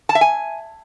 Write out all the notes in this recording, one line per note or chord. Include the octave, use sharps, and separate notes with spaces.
A5
E5
G#5